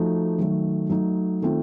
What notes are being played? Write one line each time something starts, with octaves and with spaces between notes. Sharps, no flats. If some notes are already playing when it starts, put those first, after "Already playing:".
Already playing: F3 A3 D#4 F#4
D#3 F#3 A3
F#3 A3 D#4
D#3 A3 C4 F4